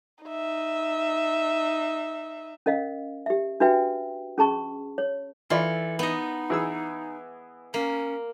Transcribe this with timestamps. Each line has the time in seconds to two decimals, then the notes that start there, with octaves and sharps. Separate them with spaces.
0.25 D#4 E5
2.66 C#4 A#4 D#5 F5
3.26 G4 E5
3.60 D4 F#4 B4 E5 G5
4.38 C#4 G#4 A5 C#6
4.98 C#5
5.50 E3 F4 A4 D5 B5
5.99 B3 D#4 D#5
6.50 E3 G#4 E6
7.74 A#3 C#4